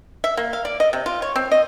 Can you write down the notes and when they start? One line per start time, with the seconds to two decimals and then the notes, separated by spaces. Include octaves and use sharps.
0.24 E5
0.37 A#3
0.53 F5
0.65 D5
0.80 D#5
0.93 C3
1.06 F4
1.22 C#5
1.36 C4
1.52 D#5